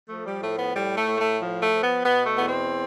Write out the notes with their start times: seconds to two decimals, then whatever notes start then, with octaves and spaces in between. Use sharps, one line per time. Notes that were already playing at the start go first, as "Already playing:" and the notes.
0.08 F3 A3
0.25 G3
0.41 A2 A3
0.57 B3
0.74 A2 G3
0.95 A3
1.06 A2
1.18 A3
1.39 F3
1.61 A3
1.72 F3
1.82 B3
2.04 B2 B3
2.26 A3
2.36 E2 B3
2.47 C4